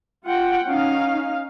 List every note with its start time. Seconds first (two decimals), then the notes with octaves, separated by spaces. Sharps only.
0.24 F4 F#5 G5
0.67 C#4 D#4 F5